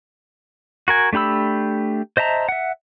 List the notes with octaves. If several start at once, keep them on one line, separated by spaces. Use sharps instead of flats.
F#4 A#4 G#5
A3 D4 G4 B5 E6
C5 D#5 E5 A5 A#5
E5 F#5